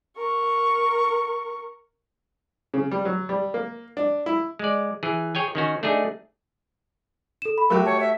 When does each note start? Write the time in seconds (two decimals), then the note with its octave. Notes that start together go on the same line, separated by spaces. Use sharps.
0.17 A#4 C#6
2.74 C#3
2.91 G3
3.05 F#3
3.29 G3
3.54 A#3
3.97 D4
4.26 E4
4.59 G#3 D5
5.03 E3 G#4
5.35 G#4 C#5 G5 G#5
5.55 D#3 C#4 F#4
5.83 A3 D4 D#4 G#4
7.42 A4 E7
7.58 B5
7.70 F#3 A3 F#4 G4 A#4
7.86 C#5 A5
8.00 E5